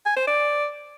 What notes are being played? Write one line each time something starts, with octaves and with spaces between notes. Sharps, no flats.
G#5
C5
D5